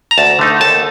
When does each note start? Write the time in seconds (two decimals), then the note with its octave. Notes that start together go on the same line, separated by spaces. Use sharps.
0.11 A#5
0.18 D2 A5
0.39 D3 A3 D#4
0.60 D#2 A5